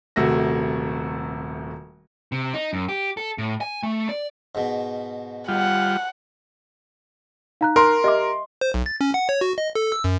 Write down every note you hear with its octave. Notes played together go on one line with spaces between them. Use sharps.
D#1 C3 A3 F#4 A#6
C3
D#4
F#2
G4
A4
A2
G#5
A3
D5
G#2 B2
G3 F4 F#5
D#4 F5 A#5 F#6
A#4 C6
G4 D#5 E5 D6
C5
B1
A6
C#4
F#5
C#5
F#4
D#5
A4
E6
F#2